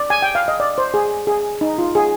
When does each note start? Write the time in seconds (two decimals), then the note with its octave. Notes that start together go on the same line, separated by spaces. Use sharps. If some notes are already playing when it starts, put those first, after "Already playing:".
Already playing: D5
0.10 G#5
0.22 G5
0.35 F5
0.48 D#5
0.60 D5
0.78 C5
0.94 G#4
1.27 G#4
1.61 D#4
1.78 F4
1.95 G#4